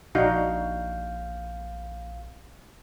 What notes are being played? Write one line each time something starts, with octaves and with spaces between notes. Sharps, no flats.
A#1 D4 D#4 F#4 F5 G6